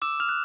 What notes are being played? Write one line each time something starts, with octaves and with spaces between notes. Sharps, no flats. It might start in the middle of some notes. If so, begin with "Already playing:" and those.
D6 E6 E7
F6 F7
F#6